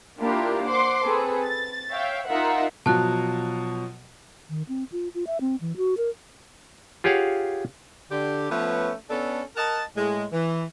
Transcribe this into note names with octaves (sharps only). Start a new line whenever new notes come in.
A#3 D4 E4 F4 G4 A#4
C5 F#5 C6 D6
C4 G#4 A4 B4
A6
C#5 E5 F5 G5
D#4 F4 A#4 E5 F#5
B2 F3 F#3 A5 F#6
D#3
C4
F4
F4
E5
C4
E3
F#4
A#4
F4 G4 G#4 C#5 F5 F#5
D3 G4
F3 A3 B3 C#4 B4 C#5
B3 C#4 D4 A4
A#4 D#5 F#5 A5
A2 G#3
E3